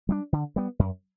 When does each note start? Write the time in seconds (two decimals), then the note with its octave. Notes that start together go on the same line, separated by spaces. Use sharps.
0.09 G3 B3 D4
0.33 D3
0.56 G3 B3
0.79 F#2